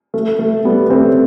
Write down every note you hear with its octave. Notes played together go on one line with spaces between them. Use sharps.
A3
A3
G3 B3
A3 C4